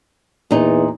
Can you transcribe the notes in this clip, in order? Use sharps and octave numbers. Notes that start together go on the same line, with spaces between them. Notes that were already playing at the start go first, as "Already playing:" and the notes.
E2 A#2 D#4